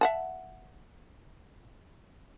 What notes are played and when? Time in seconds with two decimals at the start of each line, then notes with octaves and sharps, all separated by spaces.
0.01 E5 F#5 A5